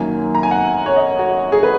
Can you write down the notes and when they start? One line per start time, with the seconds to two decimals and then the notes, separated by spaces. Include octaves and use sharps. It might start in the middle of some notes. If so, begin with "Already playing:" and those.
Already playing: F#2 D#3 F#3 A#3 G#5
0.35 A#5
0.43 G#5
0.51 F#5
0.86 C#5
0.97 D#5
1.19 F#4
1.52 G#4
1.63 B4